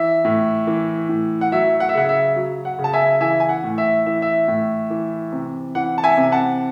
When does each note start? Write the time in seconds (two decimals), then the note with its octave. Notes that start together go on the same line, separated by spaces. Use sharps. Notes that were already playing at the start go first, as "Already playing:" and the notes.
Already playing: E3 E5
0.25 A2
0.67 E3
1.09 A2
1.41 F#5
1.52 F#3 E5
1.80 F#5
1.89 E5
1.95 C#3 F#5
2.09 E5
2.36 F#3
2.65 F#5
2.79 C#3
2.84 A5
2.93 E5 G#5
3.21 E3 E5 G#5
3.40 G#5
3.49 F#5
3.64 A2
3.78 E5
4.06 E3 E5
4.22 E5
4.48 A2
4.90 E3
5.32 C3
5.75 E3 F#5
5.98 A5
6.04 E5 G#5
6.17 C3
6.32 F#5 A5